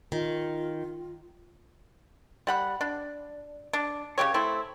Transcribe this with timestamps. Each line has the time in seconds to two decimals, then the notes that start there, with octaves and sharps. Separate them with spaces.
0.12 D#3 F4
2.47 G3 F#5 B5
2.81 D4
3.73 D4
4.18 C#3 B3 G4 C#5
4.34 A3 C4 E4